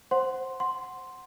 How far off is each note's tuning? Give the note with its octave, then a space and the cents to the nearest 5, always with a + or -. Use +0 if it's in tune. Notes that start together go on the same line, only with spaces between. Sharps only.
C5 +0 F#5 +0 C6 +0
F#5 +0 C6 +0